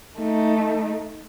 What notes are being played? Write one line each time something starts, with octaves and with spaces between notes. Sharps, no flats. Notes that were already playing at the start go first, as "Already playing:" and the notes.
A3 D#4